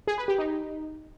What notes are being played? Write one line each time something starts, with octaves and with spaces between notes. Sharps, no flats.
G#4
B4
G4
D#4